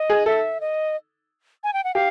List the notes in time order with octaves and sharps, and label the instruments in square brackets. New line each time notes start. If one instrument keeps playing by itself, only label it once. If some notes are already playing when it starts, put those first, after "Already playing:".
Already playing: [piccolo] D#5
[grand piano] G#4
[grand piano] A4 [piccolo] E5
[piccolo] D#5
G#5
G5
F#5
[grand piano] G4 [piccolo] F5